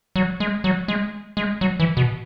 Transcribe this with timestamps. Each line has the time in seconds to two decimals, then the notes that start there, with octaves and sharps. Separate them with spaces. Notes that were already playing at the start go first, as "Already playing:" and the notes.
0.16 F#3
0.40 G#3
0.64 F#3
0.88 G#3
1.37 G#3
1.61 F#3
1.80 E3
1.97 B2